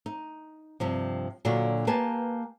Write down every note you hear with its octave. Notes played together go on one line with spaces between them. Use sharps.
D#4
G2 C3 F3
A#2 D3 F#3 D4 F4 F#4
A#3 G4 B4 G#5 A5